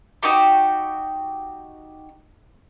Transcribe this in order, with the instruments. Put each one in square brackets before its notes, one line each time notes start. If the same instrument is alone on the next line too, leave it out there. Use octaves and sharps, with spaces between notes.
[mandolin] D#4 F#4 G4